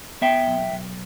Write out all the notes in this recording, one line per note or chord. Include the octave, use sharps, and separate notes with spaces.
B3 E5 G5
B1
B1